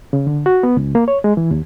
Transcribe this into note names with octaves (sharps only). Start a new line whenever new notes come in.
C#3
D3
F#4
B3
C#2
A#3
C#5
G#3
E3
D#2